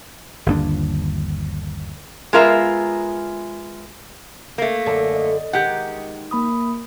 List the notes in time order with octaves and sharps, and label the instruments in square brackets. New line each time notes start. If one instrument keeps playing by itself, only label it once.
[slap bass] G1 D#2 D4
[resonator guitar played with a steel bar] G#3 B3 F4 A#4 E5 A#5
A3 A#3
[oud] F#2 D3 A4
[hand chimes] D#5
[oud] D#3 G#3 [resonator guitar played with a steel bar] G4 F#5
[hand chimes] A#3 B5 D#6